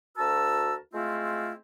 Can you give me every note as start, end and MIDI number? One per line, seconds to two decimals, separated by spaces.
0.18 0.75 38
0.18 0.75 66
0.18 0.75 70
0.18 0.75 81
0.18 0.75 88
0.94 1.53 56
0.94 1.53 57
0.94 1.53 60
0.94 1.53 64
0.94 1.53 65